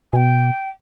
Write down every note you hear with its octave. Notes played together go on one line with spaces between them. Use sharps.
B2 G5 G#5